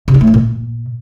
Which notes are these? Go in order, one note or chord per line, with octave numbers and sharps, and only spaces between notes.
C3
D#4
A3
E3
A#2